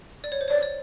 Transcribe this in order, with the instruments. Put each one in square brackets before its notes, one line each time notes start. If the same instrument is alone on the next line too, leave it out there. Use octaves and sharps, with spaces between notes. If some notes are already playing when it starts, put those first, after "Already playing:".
[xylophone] D5
C#5
C5
[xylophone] C#5 [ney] D5
[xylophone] D5